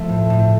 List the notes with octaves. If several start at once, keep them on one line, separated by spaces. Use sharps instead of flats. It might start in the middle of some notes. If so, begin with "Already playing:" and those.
Already playing: F3 A3
A2
A2